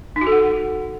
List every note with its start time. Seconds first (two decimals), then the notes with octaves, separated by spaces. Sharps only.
0.16 D#4
0.21 F#4
0.27 A4
0.32 F#5